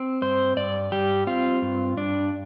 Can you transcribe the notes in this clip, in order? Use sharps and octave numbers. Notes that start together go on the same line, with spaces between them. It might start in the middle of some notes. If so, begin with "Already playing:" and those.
Already playing: C4
G2 C5
G2 D5
G3 G4
C4 F4
G2
G2 D4